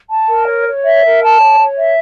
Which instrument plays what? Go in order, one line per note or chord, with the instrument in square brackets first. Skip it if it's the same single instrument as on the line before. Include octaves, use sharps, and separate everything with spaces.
[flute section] A5
A#4
C#5
C#5
E5
A#4
A5
C#5
C#5
E5